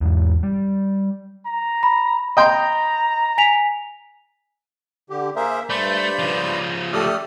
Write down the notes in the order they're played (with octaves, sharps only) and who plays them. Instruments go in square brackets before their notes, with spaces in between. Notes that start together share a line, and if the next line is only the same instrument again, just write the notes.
[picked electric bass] E2 G#2
G3
[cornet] A#5
[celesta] B5
[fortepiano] D#5 G5 C6 [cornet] A#5
[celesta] G#5 B6 F7
[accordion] D3 G4
[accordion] A#3 E5 [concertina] G#4 A#4 C5
[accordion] G2 G6 [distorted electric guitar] A3 [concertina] C5 D5 B5
[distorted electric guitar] C#3 F3
[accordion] A3 G4 A4 [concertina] D5 D#6 F6